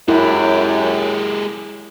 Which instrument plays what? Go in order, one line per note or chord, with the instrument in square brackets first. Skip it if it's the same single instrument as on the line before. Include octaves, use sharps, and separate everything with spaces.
[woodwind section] F#2 [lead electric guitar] G#3 G4 [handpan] E4